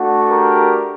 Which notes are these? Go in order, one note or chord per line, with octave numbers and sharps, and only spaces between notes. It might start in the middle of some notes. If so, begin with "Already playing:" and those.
Already playing: A3 D4 F#4
G4 A#4